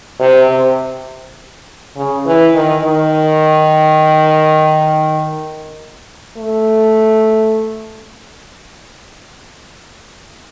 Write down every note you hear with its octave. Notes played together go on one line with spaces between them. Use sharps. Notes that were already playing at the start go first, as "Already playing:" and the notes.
C3
C3
C#3
E3
D#3
D#3
A3